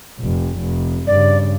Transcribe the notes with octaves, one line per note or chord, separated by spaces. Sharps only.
F1
F1
G2 C#3 D5